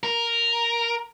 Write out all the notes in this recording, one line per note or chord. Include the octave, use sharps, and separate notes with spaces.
A#4